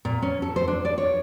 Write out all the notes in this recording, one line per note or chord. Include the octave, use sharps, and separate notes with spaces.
A#2
C#4
A4
C5
D4
D5
C#5